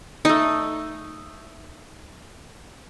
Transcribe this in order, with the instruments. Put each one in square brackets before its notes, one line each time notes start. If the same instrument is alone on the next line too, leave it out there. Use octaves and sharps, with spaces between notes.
[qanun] A3 D#4